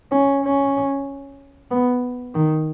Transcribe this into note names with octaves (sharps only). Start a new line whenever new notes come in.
C#4
C#4
B3
D#3